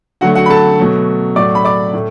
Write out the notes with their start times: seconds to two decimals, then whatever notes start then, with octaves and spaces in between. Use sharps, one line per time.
0.21 D3 F#3 A3 F#4 F#5
0.35 F#4 F#5
0.46 B5
0.50 A4 A5
0.79 B2 F#3 A3
1.36 A2 F#3 A3 D5 D6
1.55 B5
1.65 D5 D6
1.94 A2 A3